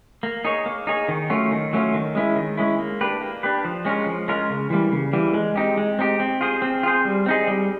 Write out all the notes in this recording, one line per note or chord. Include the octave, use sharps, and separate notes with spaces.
A#3
D#4 G#4 C#5
A#3
D#4 G#4 C#5
D#3
F#3 A3 C#4 F4
D#3
F#3 A3 C#4 F4
D#3
G#3 C#4 E4
D#3
G#3 C#4 E4
A#3
D4 G4 B4
A#3
D4 G4 B4
F3
G#3 C#4 F4 A#4
F3
G#3 C#4 F4 A#4
C#3
E3 G3 A#3
C#3
E3 G3 A#3
G#3
C4 D#4 G4
G#3
C4 D#4 G4
C4
F4 G#4 C5
C4
F4 G#4 C5
G3
C4 D#4 G#4
G3